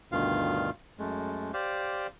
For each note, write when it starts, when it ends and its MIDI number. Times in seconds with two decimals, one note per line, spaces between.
0.12 0.70 38
0.12 0.70 43
0.12 0.70 47
0.12 0.70 51
0.12 0.70 65
0.12 0.70 77
0.99 1.52 42
0.99 1.52 56
0.99 1.52 57
1.53 2.07 67
1.53 2.07 72
1.53 2.07 74
1.53 2.07 77